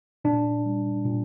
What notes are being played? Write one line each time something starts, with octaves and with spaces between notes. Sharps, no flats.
A#2 D4
G3
A#2